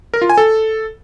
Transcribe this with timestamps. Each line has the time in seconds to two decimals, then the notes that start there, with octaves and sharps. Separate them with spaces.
0.14 A#4
0.22 F4
0.30 G#5
0.38 A4